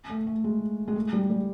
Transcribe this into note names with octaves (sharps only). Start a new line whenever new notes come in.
A3
A3
G#3
G#3
A3
G3
G3